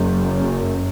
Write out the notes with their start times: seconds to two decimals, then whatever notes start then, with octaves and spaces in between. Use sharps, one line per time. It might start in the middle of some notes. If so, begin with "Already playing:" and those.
Already playing: F#1 F#2